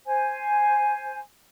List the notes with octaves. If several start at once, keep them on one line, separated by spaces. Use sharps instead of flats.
C5 G#5